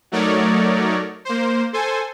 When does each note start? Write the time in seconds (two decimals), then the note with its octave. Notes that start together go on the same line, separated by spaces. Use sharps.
0.12 F#3 A3 D#4 A#4 C#5 D5
1.25 A#3 C5
1.73 A4 C5 G#5